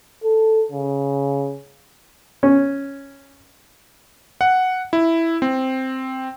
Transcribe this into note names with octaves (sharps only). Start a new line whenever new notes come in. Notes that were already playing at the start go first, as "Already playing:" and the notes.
A4
C#3
C#4
F#5
E4
C4